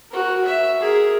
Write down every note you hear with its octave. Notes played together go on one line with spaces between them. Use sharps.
F#4 A#4
E5
G#4 A#4